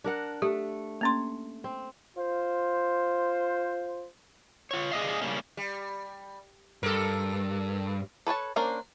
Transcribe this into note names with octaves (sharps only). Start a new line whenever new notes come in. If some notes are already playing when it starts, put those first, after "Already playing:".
D4 A#4 F#5
A3 G4
A#3 C#4 C6
C4
F4 C5
F4 C#5
G#4 D5 D#5 F5
C#3 G3 A#3 C#4
G3
G2 A4 A#4
A4 B4 C#5 A5
A#3 C#4 D4 A#4 C5